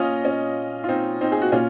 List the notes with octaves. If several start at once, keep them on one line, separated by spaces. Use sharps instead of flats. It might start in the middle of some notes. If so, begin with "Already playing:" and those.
Already playing: A#2 C#4 F4 D#5
C#4
F4
C4 D#4
C4 D#4
G#4
F#4
A#2 C#4 F4